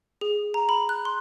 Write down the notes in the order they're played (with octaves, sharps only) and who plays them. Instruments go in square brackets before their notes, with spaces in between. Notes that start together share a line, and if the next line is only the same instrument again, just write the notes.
[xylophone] G#4
A#5
B5
F#6
C6